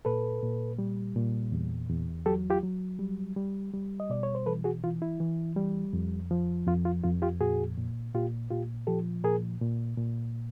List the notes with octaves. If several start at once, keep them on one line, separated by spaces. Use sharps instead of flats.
A#2 A4 B4
A#2
G3
A#2
E2
E2
F#3 G4 A4
F4 G4
F#3
G3
G3
G3
D#5
B2 D5
C#5
C5
E3 A4 B4
F#4 G#4
E3 F4
E4
E3
G3
F2
F3
F2 F4
F4
F2 F4
F4 G4
A#2 F#4 G#4
A#2
A#2 F4 G4
A#2 F4 G4
F3 G4 A4
A#2 G#4 A#4
A#2
A#2